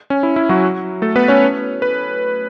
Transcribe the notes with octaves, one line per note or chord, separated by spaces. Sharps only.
C#4
E4
E4
F#3 F#4
A3 A4
B3 B4
C#4 C#5
B4